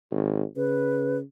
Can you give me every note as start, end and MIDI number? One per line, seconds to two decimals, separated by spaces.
0.12 0.43 32
0.57 1.21 49
0.57 1.17 71